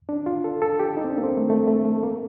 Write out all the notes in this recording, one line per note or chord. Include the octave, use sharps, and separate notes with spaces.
D4
F4
A4
A4
G4
D#4
C4
D4
A#3
C4
A3
A3
A3
A3
A#3